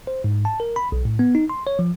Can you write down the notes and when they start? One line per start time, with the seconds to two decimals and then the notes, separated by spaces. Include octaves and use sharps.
0.07 C5
0.24 G#2
0.45 A5
0.60 A#4
0.76 B5
0.92 B1
1.05 A2
1.19 B3
1.35 D#4
1.50 C6
1.67 C#5
1.79 F3